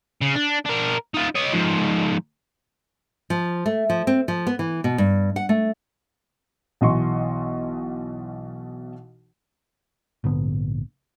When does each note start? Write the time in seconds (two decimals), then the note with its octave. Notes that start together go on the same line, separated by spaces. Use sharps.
0.21 C#3
0.36 D4
0.66 D4 A#4
1.14 D#4 F4
1.35 C#5 D#5
1.53 G#2 F3
3.30 F3
3.66 A3
3.90 F3
4.07 C4
4.28 F3
4.47 B3
4.59 E3
4.84 B2
4.98 G2
5.36 F#5
5.49 A3
6.81 B1 B2 E3 D#5 C6 C#6
10.24 A#1 G#2 D3 B3